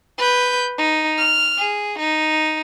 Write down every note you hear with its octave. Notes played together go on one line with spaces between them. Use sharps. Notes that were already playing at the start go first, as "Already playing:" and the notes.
B4 G6
D#4
F6
G#4
D#4